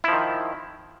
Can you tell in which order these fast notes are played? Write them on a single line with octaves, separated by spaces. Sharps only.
E4 F3 D#3